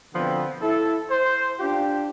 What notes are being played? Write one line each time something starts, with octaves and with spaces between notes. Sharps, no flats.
B2 D3 F3 B3 C4
E4 A4
C5
D4 F4 G4